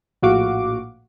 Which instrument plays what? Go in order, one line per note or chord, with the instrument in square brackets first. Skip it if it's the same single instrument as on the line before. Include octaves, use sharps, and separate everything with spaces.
[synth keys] A#1 A2 F#4 F5 D6